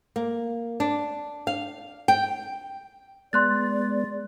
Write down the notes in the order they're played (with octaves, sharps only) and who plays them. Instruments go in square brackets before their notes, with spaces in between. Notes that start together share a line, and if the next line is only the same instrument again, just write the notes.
[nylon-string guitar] A#3
D4
F5
G5
[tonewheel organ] G#3 B3 [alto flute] D5 [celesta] C6 F#6 A6